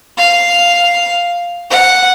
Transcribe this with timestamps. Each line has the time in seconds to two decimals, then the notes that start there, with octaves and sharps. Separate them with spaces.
0.17 F5
1.70 F#5